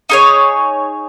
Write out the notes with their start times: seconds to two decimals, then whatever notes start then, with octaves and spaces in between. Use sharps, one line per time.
0.09 D#4 G#4 C#5